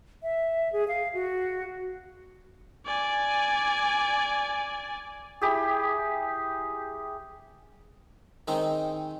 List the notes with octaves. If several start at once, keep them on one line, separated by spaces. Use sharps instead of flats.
E5
G#4
F5
F#4
D5 G#5
E4 G4 G#4
D#3 G#3 C4 D#4